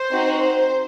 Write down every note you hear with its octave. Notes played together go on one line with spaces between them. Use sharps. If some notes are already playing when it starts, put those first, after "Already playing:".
Already playing: C5
C4 D#4 F#4
C5